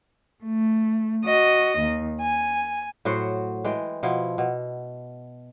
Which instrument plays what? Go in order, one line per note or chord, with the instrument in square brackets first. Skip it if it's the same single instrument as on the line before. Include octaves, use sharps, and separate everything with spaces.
[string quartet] A3
F#4 D#5
D#2
G#5
[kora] A2 F#3 F#4 C5
E3 G#3 G5
B2 F3 E4
B2